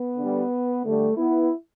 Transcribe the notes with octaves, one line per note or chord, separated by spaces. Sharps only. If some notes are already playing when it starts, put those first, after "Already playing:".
Already playing: B3
D3
G3
D3 G3 A3
B3 E4